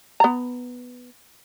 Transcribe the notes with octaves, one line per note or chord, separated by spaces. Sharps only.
B3 A#5